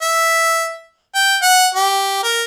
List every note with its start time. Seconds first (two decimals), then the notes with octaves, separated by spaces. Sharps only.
0.02 E5
1.15 G5
1.42 F#5
1.75 G4
2.23 A#4